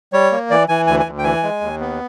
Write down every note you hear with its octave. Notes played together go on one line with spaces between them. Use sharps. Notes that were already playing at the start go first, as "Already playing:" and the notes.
G3 C#5
A#3
E3 D5
E3 G#5
D2 G#5
G#5
D2
G5
E3 G#5
G#3
D#2
B3